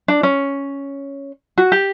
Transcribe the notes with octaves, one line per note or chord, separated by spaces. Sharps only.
D4
C#4
F#4
G4